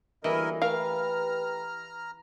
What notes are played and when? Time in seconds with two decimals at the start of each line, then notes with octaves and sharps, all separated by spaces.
0.24 D2 E3 G3 A#3 E4 A#4 D#5
0.62 A3 G4 A#4 B4 F5 A#5 F6